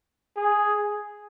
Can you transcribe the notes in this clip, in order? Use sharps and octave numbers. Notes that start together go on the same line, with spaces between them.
G#4